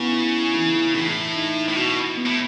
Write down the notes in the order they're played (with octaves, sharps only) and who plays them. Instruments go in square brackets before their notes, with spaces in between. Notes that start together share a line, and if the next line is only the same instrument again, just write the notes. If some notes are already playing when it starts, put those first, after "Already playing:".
Already playing: [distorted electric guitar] C#3 [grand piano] B3 E4
[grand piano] E4
E3
[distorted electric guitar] A2 [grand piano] E3
[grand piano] D#4
[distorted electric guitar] A2
[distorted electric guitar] B2 [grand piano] F#4
[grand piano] B3
[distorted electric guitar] A2